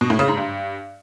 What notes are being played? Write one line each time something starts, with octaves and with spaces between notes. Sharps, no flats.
B2
A2
C#3
G#2
G2